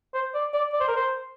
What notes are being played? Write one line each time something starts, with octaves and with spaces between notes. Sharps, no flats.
C5
D5
D5
D5
C5
A#4
C5